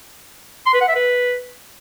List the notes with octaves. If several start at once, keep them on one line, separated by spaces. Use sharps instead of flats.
C6
B4
F#5
E5
B4